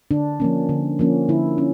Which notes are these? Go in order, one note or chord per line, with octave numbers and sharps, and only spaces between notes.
D3 D4
F3 A#3 C#4
D3
F3 A#3 C#4
D3 E4
C#4